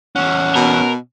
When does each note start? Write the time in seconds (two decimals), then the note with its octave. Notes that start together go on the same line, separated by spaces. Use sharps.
0.16 E2 C#4 F#5
0.55 B2 A#4